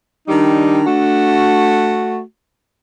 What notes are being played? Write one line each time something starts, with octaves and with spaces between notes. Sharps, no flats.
D#3 G3 D4 D#4
A3 F#4